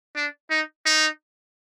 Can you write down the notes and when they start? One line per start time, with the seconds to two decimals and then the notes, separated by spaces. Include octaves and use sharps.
0.16 D4
0.50 D#4
0.86 D#4